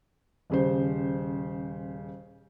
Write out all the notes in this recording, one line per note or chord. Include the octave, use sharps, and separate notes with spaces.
D#1 C#3 C5